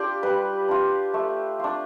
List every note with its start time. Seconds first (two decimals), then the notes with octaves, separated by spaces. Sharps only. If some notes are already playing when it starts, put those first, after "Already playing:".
Already playing: D4 F4 G4 D5
0.23 G3 B4
0.69 D4 F4
1.14 A3
1.60 D4 F4